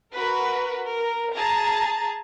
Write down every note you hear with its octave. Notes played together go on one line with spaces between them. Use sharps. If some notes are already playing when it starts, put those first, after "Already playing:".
F#4 A#4 B4
A#4
G#4 A5 A#5